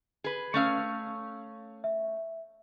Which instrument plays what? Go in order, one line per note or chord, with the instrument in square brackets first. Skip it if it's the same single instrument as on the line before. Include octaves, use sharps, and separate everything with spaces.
[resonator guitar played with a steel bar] G#4 B4
[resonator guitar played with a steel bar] A3 C#4 F5 [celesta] C#6 E6
[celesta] E5